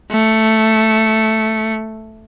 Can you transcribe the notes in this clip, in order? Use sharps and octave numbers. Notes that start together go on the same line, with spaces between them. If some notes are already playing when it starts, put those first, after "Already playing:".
A3 C#7